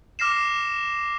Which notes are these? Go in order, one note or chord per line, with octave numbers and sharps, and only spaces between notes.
D6 F6 A#6 C7 E7